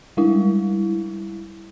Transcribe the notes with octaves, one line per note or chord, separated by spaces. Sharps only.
G3 G#3 E4